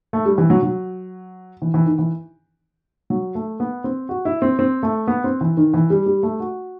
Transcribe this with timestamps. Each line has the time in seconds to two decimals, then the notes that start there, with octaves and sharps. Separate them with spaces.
0.13 A3
0.25 G3
0.38 E3
0.50 F#3
0.63 F#3
1.62 E3
1.74 E3
1.86 D#3
1.99 E3
3.10 F#3
3.35 A3
3.60 B3
3.84 C4
4.09 F#4
4.25 E4
4.42 C4
4.59 C4
4.83 A3
5.07 B3
5.24 C4
5.41 E3
5.57 D#3
5.74 E3
5.90 G3
6.06 G3
6.23 A3
6.40 F#4